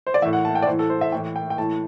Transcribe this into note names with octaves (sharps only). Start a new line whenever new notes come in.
C5
D5
A2 E3 E5
F#5
A5
G5
D5
A2 E3 C5
A4
C5
E5
A2 E3 G5
G5
G5
A2 E3 A5